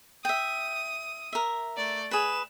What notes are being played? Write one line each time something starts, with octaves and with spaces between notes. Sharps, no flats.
E5 G5 D#6
A#4 E5
A3 D5
G#4 B4 E7